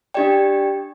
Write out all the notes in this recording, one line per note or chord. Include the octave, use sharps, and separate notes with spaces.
D4 G4 D5 G5